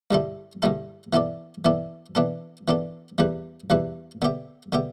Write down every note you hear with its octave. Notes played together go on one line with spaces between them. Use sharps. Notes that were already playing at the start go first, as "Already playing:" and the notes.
G2 D3 G3 E4 A4
G2 D3 G3 E4 A4
E3 B3 E4 A4 D5
E3 B3 E4 A4 D5
E3 B3 D4 A4
E3 B3 D4 A4
E2 E3 G3 E4 B4
E2 E3 G3 E4 B4
D3 B3 G4 E5
D3 B3 G4 E5